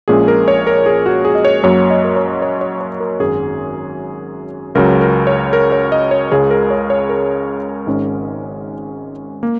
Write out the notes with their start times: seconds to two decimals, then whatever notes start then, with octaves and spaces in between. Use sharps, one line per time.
0.08 A#1 A#2 G#3 C#4 G#4
0.28 A#4
0.48 C#5
0.67 A#4
0.86 G#4
1.06 F#4
1.25 G#4
1.35 D#5
1.45 C#5
1.63 F#2 F#3 A#3 C#5
1.90 D#5
2.04 A#4
2.16 C#5
2.42 C#5
2.61 C#5
2.81 C#5
3.00 A#4
3.20 G#1 F#2 F#3 C#4 G#4
4.75 C#2 C#3 F#3 A#4
5.01 A#4
5.27 C#5
5.53 A#4
5.72 C#5
5.92 D#5
6.11 C#5
6.31 C#2 C#3 G#3 G#4
6.51 A#4
6.70 C#5
6.90 C#5
7.09 A#4
7.87 G#1 G#2 G#3 C#4
9.43 A#3